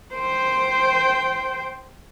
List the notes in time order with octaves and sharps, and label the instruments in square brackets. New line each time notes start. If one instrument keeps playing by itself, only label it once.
[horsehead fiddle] C5 G5